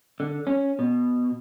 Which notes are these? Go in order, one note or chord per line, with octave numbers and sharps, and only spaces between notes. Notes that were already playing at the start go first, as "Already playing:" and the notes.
D3
C#4
B2